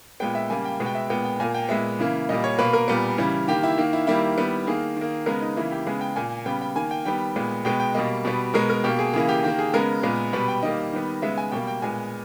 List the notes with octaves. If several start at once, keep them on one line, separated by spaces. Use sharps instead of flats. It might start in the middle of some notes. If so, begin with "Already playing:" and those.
A#2 G#3 B3 G5
E5
C#3 G3 A#3 G#5
G5
B2 G#3 B3
G5
E5
A#2 G#3 B3 G5
G5
A#2 A#3 G#5
G5
A#2 G#3 B3 E5
C#3 E3 A#3
A#2 G3 A#3 D#5
C#5
B2 A#3 B4
A#4
A#2 G3 B3
C#3 E3 G3
D#3 A#3 G4
E4
D#3 A#3
E4
D#3 G3 A#3 E4
D#3 G3 B3
D#3 A#3 G#4
D#3
A#3
C#3 G#3 B3 A#4
D#4
C#3 E3 A#3 E4
G4
C#3 G#3 B3 G#4
G5
A#2 A#3 G#5
C#3 G3 B3 G5
G5
D#3 A#3 G#5
G5
D#3 G3 B3 G5
A#2 G#3 B3
B2 G#3 B3 G5
G5
B2 G3 A#3 D#5
B2 G3 B3
B2 G#3 B3 A#4
A#4
B2 A#3 G4
G#4
C#3 E3 A#3 G#4
G4
D#3 A#3 G4
G#4
C#3 G#3 B3 A#4
A#2 G#3 B3
B2 G3 B3 B4
G5
D#3 G3 A#3 D#5
D#3 G3 B3
C#3 G#3 B3 E5
G#5
B2 G3 A#3 G5
G5
A#2 G#3 B3 G#5